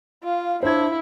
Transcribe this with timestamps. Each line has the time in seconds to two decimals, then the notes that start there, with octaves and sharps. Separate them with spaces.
0.24 F4 F5
0.63 D4 E4 C5 G#6